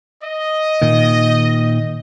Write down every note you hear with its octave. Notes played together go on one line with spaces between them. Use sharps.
D#5
A#2 D#3